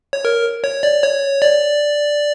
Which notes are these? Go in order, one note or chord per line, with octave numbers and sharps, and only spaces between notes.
C#5
A#4
C#5
D5
C#5
D5